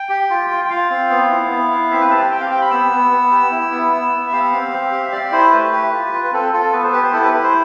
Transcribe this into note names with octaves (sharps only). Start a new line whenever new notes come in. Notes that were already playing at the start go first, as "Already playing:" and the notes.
Already playing: G5
G4
F4
F4
G5
F4 F5
C4
B3
E4
B3
E4
C4 E5
B4
G4 A5
C4 G5
F5
G4 G5
B5
B3 E6
B3
B3
G4
E4
B3
B3
B3
E5
G4 F5
C4
C4
G4
E5
G4 D5
E4 C5
A3 B4
G4
F4
F4
B4
C4 A4
F4 A4
B3 B4
C5
G4 B4
C5
E4 A4
B4
E4
C5